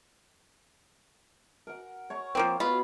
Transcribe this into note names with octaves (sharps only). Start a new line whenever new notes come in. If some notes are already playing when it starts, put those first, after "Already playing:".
A#4 F#5
C#5 A#5 C#6
F3 A#3 C4
B3 F4 F#4 D#5 B5